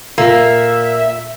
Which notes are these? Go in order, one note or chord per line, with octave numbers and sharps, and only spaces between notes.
A#2 A#3 A4 E5 C7